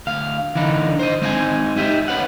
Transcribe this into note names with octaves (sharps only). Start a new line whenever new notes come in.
D2 F5
D3 E3 D4 D#4
C5 D#5
G#3 C4 D#4 D#5 F5 G#5
D#4 G4 D#5 E5
C#4 B4 C#5 F#5